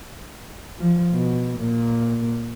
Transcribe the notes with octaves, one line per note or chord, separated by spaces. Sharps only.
F3
B2
A#2 A#3